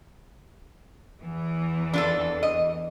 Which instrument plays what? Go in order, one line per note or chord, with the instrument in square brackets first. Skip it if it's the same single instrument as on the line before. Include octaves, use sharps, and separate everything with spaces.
[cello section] E2 E3
[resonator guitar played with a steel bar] D4 F4 A4
D#5